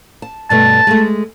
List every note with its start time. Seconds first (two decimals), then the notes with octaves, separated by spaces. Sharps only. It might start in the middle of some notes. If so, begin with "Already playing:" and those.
0.22 A5
0.50 G2 B2 A3 A5
0.87 G#3 A3